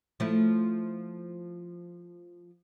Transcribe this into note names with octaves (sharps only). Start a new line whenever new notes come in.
F3 A3 E4